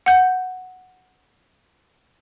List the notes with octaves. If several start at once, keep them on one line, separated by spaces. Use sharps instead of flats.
F#5 G6